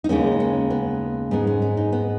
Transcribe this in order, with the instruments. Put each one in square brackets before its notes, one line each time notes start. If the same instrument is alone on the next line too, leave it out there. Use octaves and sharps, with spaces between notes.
[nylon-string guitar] D#4
D#2 C#3 G#3 B3 C#4
C#4
B3
G#2 G#3 B3 C#4
C#4
C#4
D#4
B3